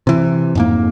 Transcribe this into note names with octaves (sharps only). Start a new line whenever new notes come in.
C3 E3
F2 G#2 A#3